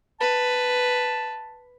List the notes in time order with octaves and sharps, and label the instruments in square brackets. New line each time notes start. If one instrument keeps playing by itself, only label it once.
[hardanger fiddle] B4 [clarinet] A5